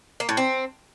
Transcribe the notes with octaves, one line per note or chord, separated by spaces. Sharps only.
A#3
A2
C4